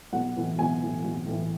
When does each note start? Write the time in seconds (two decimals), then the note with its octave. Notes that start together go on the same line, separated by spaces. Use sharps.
0.13 B1 F#5
0.35 A2 E3
0.58 B1 G#5
0.81 A2 E3
1.04 B1
1.26 A2 E3